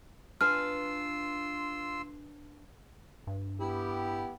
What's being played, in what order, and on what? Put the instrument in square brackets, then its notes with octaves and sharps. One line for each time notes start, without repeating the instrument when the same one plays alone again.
[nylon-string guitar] D4 B4 G#5 [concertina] F4 C6 E6 [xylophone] F6
[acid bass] G2
[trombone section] B3 G4 [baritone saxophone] E4